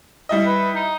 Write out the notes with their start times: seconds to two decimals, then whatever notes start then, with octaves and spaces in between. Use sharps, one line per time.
0.29 G3 E4 D#5
0.46 B4
0.75 D#4